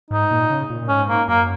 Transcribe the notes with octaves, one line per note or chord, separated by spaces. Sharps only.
G#2 D#4
A#2
C#3
A#2
A#2
G#2 C#4
A#3
F#2 A#3